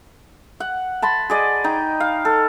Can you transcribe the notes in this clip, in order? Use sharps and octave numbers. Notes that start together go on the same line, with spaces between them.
F#5
A5 B5 C6
G#4 D5 D#5
D#4 G5
F5
A4